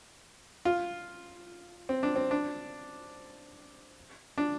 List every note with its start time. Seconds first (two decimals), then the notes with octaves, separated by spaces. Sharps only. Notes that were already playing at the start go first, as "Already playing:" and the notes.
0.65 F4
1.89 C4
2.03 D4
2.16 C4
2.31 D4
4.38 D4